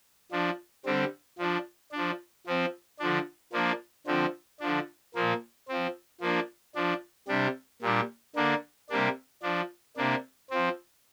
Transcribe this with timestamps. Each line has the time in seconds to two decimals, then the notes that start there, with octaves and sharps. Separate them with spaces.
0.32 F3 D4
0.85 D3 G3 C4
1.38 F3 D4
1.92 D4
1.97 F3
2.47 F3 C4
2.99 D3 F3 D4
3.53 F3 A#3 D4
4.06 D3 F3 C4
4.60 D3 F3 D4
5.15 A#2 F3 A#3
5.68 F3 C4
6.21 F3 A#3 D4
6.75 F3 D4
7.28 C3 G3 D4
7.82 A#2 G3 D4
8.35 D3 A#3 D4
8.90 C3 G3 A#3 D4
9.43 F3 D4
9.97 C3 A#3 D4
10.50 F3 C4